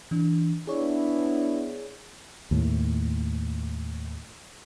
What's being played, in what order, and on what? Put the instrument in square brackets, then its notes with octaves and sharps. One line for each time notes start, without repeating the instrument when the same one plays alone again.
[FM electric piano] E3 D4
[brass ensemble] B3 D4 E4 [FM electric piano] G#4 C#5 D5
[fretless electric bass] D#2 A2